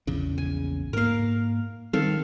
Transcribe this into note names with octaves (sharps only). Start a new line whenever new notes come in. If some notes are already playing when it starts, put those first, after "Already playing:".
A#1 E2 C#3
G#5
G#2 A#3 A#4 F5
D#3 G3 C4 A4 F5